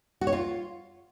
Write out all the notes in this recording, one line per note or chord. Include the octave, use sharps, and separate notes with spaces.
F#4
C#5
F4